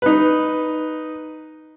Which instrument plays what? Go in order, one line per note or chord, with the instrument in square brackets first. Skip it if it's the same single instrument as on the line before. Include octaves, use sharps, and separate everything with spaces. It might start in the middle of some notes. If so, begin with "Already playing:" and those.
[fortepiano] D#4 B4